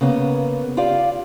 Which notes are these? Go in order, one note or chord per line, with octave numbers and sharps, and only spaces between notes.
C#3 A#3 B3
F4 G4 D5 F5